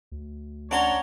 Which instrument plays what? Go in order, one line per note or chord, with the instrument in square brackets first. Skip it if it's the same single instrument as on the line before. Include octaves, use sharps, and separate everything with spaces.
[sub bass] D2
[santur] C#4 F#5 [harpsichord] D4 C6 [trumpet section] C#5 A#5